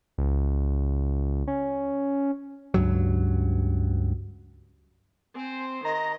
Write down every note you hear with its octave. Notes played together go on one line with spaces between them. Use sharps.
C#2
C#4
C#2 G2 F#3
C4 C5 G#5
D#3 D#5 A#5